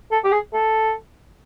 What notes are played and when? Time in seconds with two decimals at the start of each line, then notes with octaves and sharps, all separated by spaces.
0.12 A4
0.24 G4
0.32 G#4
0.54 A4